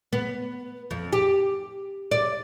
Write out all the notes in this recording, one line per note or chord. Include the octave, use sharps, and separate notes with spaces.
B3
F2
G4
D5